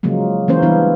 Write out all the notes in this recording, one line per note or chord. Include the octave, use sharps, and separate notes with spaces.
C#3 F3 F#3 G#3 A#3
E3 A#3 C#4 C5
E3 G3 G#3 B3 D4 E4